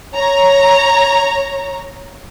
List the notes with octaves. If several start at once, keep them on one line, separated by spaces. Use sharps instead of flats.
C#5 A#5